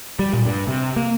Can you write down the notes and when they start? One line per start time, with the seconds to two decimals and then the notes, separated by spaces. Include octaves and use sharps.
0.19 G3
0.33 A#2
0.45 G2
0.67 C3
0.96 A#3